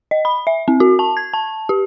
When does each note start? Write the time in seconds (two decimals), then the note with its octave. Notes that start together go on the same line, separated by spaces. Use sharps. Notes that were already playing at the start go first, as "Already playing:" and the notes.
0.11 D#5
0.25 B5
0.47 E5
0.68 C4
0.80 F#4
0.99 A5
1.17 G#6
1.34 A5
1.69 G4